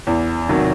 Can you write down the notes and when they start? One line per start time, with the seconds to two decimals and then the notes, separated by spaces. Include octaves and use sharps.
0.07 E2
0.49 C3 D#3 F#3